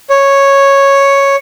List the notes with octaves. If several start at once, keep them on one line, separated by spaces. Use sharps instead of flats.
C#5